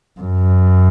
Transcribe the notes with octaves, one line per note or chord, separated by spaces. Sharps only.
F#2